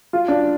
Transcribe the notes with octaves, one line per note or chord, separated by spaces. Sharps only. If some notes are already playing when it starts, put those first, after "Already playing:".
F4
D4